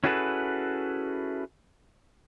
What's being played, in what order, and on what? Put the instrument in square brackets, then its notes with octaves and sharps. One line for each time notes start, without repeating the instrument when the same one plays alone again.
[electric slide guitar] C#4 E4 F#4 G#4 A4 B4